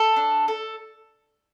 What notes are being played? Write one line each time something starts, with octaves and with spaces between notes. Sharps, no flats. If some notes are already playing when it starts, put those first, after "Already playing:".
Already playing: A4
D4
A4